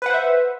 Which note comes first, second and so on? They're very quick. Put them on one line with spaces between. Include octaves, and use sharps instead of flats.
B4 F#5 C5 E5